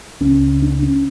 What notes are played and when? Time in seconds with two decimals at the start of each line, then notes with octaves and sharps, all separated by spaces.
0.20 C#2 C#3 C#4
0.62 D4
0.82 C#4